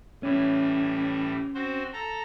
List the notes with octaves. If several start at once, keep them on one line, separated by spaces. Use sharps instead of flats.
A2 E3 G3 C#4
C4 F#4 C5
A4 A#5